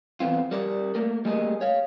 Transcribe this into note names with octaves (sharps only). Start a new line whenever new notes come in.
E2 G#2 B3 C4 F4
G3 A#4 D5
A3 A#3 A#4
G3 A3 A#3 G#4 A#4 D#5
C#5 F5